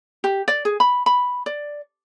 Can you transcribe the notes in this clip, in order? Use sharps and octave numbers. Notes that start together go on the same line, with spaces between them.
G4
D5
G#4
B5
B5
D5